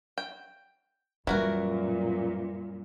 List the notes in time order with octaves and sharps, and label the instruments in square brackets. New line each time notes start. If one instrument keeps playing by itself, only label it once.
[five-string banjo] G5
[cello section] F#2 A#2 [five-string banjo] E3 F#4 A#4 [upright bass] G3